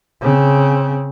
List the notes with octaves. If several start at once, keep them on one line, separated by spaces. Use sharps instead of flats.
C#3 C4